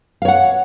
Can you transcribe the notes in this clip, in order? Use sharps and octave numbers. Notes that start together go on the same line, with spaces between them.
C#5 F5 F#5